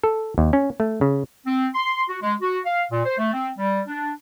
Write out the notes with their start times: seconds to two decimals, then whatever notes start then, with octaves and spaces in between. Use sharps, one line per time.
0.04 A4
0.38 D#2
0.53 C#4
0.80 A3
1.01 C#3
1.46 C4
1.75 C6
2.09 F#4
2.22 G#3
2.42 F#4
2.66 F5
2.91 A#2
3.05 C5
3.19 A3
3.33 C4
3.58 G3
3.88 D4